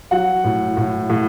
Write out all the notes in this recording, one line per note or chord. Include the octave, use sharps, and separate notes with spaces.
F#3 F#5
A2
A2
A2